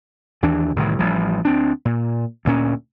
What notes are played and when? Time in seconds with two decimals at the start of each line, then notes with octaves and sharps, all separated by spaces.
0.42 D#2 E3 D4
0.76 C2 A2 D#3 E3
0.99 A1 F3 G3
1.45 D2 C4 D4
1.85 A#2
2.45 D2 A#2 C#4